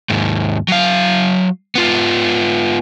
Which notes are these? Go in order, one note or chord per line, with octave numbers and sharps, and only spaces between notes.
D#2 G#2
F#3 F5
B3 F4